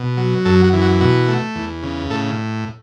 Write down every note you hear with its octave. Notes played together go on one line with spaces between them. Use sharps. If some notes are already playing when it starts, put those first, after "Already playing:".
Already playing: B2
F#3
F#2 A4
F#4
E3
F#4
B2 F#4
A3
E2
C#3
A2 A4